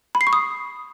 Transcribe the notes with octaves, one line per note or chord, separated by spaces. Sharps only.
B5
C7
C#6
D#6